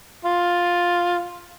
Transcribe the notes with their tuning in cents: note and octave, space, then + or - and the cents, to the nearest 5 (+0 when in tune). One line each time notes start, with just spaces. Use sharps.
F4 +5